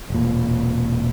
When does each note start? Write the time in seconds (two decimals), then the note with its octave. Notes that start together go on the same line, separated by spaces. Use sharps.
0.10 E1 A#2